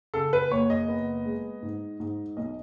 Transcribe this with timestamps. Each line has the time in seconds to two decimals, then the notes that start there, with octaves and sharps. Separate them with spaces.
0.14 C#3 A4
0.33 B4
0.51 F#1 C#5
0.70 D#5
0.88 B3
1.25 G#3
1.62 G#2
2.00 G#2
2.37 B1 D#5